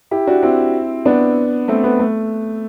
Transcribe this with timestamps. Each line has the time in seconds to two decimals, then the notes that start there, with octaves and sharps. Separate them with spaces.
0.11 E4 G4
0.27 D4 F#4
0.43 C4 E4
1.05 B3 D4
1.68 A3 C4
1.84 B3
1.99 A3